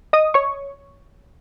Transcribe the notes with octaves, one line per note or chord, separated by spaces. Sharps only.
D#5 D#6
C#5 C#6